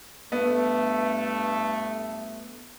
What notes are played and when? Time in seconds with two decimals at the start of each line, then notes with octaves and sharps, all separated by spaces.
0.32 G2 A3 B3